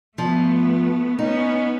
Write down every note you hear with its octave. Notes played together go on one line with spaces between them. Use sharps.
F3 A3 B3
B3 C#4 D#4